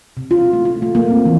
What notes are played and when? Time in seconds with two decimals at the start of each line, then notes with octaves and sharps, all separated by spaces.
0.17 C3
0.31 F4
0.53 A3
0.65 F4
0.82 A3
0.95 A#3
1.11 C4
1.26 E3